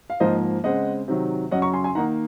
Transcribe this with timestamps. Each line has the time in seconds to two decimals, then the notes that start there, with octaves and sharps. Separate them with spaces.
0.10 F5
0.20 G#2 F3 A#3 C5 D#5
0.64 C#3 G#3 C4 D#5 F#5
1.08 C3 D#3 F#3
1.51 F#2 C#3 F#3 C#4 D#5 F#5
1.62 A#5 C#6
1.74 G#5 C6
1.84 G#5 C6
1.95 D#3 A#3 D#4 F#5 A#5